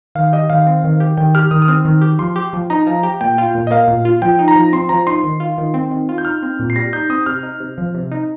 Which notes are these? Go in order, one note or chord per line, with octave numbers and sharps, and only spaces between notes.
D#3 F5
G4 D#5
D#3 F5
C4
D#3
G4
D#3 G5
G4 F6
D#3 D#6
D#6
C4 F6
D#3
G4
F3 C6
G4
F3
D#4 A#5
F3
G4
A#2 G5
F4
A#2
D#5
A#3 F5
A#2
F4
F3 G5
D#4
A#5
F3
C4 C6
F3 A#5
D#4 C6
D#3
F4
D#3
C4
D#3
F4
G6
D#4 F6
C4
A#2
C7
G3 A#6
D#4 G6
C4 D#6
C3 F6
D#4
C3
F3
C3
D#4